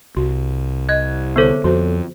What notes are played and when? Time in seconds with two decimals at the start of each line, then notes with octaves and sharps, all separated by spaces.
0.17 C2 F#4
0.89 D#5 F#6 G#6
1.36 D3 B3 A4 C5 C#5
1.64 F2 F#4 C5